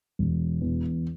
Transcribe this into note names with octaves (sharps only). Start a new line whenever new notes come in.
E1
E2